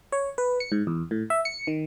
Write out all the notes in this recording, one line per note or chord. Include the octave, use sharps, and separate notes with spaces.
C#5
B4
C#7
G#2
E2
A2
E5
C#7
D#3